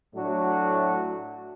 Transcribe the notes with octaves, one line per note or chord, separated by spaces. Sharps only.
A2 F#3 A3 D4 F#4